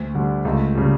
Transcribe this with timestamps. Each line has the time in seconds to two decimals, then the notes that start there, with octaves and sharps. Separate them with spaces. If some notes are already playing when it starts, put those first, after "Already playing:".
Already playing: D2
0.14 D3 G3
0.45 C#2 A3
0.75 C#3 G3